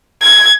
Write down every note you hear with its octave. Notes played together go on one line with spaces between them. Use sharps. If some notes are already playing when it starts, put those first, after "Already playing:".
G#6